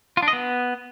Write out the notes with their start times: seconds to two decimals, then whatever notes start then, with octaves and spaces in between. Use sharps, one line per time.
0.17 F4
0.23 D4
0.28 D#5
0.33 B3